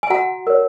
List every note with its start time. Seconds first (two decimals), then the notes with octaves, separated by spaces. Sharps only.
0.03 G#5
0.10 F#4 F#5 A#5
0.47 A#4 C#5